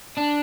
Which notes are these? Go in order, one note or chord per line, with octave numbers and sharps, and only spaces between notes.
D4